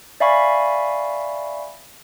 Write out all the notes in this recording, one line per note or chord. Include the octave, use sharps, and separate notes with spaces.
D5 E5 F5 G#5 B5 C#6